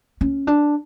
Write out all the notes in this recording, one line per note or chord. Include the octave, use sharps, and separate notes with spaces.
C#4
D4